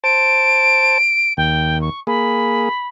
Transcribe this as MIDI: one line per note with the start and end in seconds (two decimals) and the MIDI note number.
0.04 0.98 72
0.04 0.98 81
0.04 1.33 98
1.37 1.90 39
1.37 1.80 79
1.81 2.00 85
2.07 2.69 58
2.07 2.69 68
2.07 2.87 83